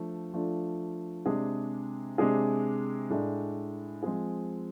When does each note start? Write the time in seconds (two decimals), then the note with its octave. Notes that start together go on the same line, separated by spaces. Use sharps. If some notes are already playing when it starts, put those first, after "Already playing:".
Already playing: F3 A3 D4
0.33 F3 A3 D4 F4
1.26 C3 G#3 D4 G#4
2.18 C3 G#3 D4 G#4
3.10 A2 G#3 D4
4.03 F3 G#3 C4 G#4